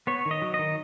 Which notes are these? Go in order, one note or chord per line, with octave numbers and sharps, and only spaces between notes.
B3 C#5
D#3
D#5
F#3
D#5
D#3